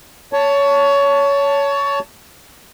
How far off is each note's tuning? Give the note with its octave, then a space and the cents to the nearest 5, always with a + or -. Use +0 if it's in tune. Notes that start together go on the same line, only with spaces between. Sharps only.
C#5 +20 A5 +0